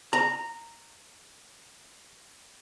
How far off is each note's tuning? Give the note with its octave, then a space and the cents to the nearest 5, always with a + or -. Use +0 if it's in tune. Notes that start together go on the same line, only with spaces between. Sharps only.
A#5 -10